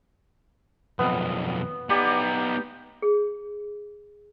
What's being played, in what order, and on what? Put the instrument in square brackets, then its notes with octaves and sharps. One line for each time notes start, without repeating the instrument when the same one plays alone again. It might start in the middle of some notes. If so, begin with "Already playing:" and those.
[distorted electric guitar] B1 F2 [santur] B3
[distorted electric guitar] B3 D#4 [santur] G4 D5
[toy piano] G#4